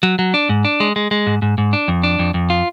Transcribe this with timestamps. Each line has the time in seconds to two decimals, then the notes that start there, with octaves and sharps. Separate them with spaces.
0.03 F#3
0.19 F#3
0.34 D4
0.49 G#2
0.65 D4
0.80 G#3
0.96 G#3
1.11 G#3
1.27 G#2
1.42 G#2
1.58 G#2
1.73 D4
1.88 F2
2.03 D4
2.19 F2
2.34 F2
2.50 F4